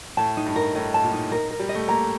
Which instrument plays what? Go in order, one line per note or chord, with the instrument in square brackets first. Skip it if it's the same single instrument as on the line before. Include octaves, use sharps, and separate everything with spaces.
[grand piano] A2 [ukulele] A5
[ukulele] D#4
[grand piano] G2
[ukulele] A#4
[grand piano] A2 [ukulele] D#5
[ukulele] A5
[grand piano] A#2
[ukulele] D#4
A#4
A#4
[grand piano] G3
[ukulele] D#5
[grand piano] A3
[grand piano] A#3 [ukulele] A#5